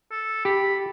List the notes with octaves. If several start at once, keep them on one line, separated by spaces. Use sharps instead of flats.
A4
G4 B5